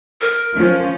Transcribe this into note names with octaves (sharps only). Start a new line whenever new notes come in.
A#4
F3 C#4